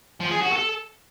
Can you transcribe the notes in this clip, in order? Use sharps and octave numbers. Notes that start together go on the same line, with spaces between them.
F3
G#4
F#4
A4